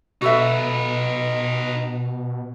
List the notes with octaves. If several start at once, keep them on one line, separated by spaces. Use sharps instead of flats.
B2 D#4 F#4 A4 B4 E5